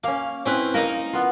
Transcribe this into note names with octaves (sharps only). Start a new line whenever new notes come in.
A#3 C#4 F5
C4 C#4 E4 B4
A#3 D#4 A#4
B3 F4